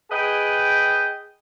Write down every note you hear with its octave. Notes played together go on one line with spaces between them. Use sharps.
G#4 B4 D#5 G5